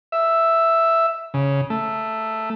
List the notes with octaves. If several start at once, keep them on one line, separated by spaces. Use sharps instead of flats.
E5
C#3
A3